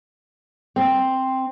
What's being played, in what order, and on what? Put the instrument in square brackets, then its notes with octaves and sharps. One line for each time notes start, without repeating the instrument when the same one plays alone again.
[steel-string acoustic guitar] C4